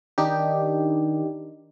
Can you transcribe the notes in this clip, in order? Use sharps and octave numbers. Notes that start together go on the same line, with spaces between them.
D#3 D4 D#4 G4